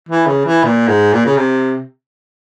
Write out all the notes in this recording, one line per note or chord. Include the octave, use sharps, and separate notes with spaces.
E3
C#3
E3
A#2
G#2
A#2
C#3
C3